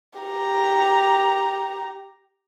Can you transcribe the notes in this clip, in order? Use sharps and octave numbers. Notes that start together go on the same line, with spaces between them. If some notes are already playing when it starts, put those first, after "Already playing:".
G4 A#5